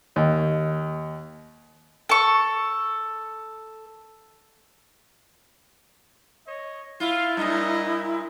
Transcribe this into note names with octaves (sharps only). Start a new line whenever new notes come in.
D#2
A4 C#6
C#5 D#5
E4 F4 F5
G2 A#2 D#5